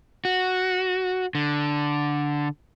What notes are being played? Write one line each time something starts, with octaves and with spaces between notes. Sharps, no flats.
F#4
D3